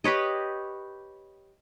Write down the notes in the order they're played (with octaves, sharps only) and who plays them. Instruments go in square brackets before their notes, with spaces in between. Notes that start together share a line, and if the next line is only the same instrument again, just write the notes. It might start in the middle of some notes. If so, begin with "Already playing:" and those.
[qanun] G4 B4 C#5 D#5